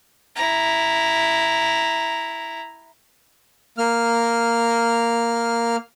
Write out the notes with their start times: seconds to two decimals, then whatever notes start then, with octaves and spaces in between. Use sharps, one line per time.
0.36 E4 A#5
3.78 A#3 F6